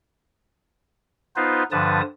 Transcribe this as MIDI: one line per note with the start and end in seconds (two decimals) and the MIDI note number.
1.36 1.63 59
1.36 1.63 63
1.36 1.63 65
1.36 1.63 71
1.36 1.63 72
1.72 2.01 43
1.72 2.01 50
1.72 2.01 53
1.72 2.01 71
1.72 2.01 81
1.72 2.01 87